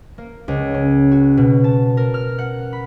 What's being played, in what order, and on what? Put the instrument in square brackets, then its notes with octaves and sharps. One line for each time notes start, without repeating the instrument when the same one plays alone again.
[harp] A#3
C#2
C#4
F#4
B2
A5
A#4
F6
F#5
B5